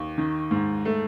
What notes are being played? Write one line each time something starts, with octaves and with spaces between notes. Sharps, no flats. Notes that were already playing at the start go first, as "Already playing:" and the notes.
Already playing: D#2
D#3
G#2
A3